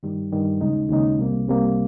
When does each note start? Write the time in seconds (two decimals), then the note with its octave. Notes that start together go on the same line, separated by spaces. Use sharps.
0.03 G2 D#3 G3
0.32 G2 D#3 G3
0.61 D#2 C#3 G#3 D#4
0.90 D#2 C#3 G#3 D#4
1.19 C2 C3 G3 A#3
1.48 C2 C3 G3 A#3